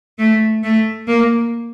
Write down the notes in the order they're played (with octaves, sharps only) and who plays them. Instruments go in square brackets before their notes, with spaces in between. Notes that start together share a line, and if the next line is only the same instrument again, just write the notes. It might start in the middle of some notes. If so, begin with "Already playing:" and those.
[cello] A3
A3
A#3